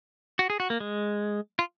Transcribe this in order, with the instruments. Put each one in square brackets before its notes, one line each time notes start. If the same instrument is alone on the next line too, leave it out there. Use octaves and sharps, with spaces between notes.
[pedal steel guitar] F#4
G#4
F#4
A#3
G#3
F4